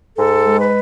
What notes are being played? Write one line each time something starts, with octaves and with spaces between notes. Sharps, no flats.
G#2 A4
G#3
B4